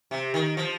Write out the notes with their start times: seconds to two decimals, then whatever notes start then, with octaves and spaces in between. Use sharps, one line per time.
0.11 C3
0.34 D#3
0.57 F3